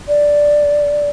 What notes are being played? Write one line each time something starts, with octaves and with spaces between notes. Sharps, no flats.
D5